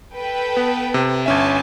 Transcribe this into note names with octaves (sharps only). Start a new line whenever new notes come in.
A4 B4 G5
B3
C3
G1 C#4 E5 G#5 A5